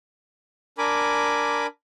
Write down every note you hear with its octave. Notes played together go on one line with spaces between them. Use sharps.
D4 A#4 G#5 B5 D6